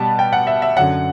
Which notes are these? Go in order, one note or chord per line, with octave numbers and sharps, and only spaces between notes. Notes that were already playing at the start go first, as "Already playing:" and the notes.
Already playing: B2 G3 B3 A5
G5
F#5
E5
E5
F#2 D3 F#3 F#5